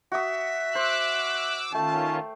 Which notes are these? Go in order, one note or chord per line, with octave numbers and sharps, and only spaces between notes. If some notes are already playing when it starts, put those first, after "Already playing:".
F#4 E5 D#6
C5 D6 E6 F#6
D#3 A3 C#4 F4 G5 A5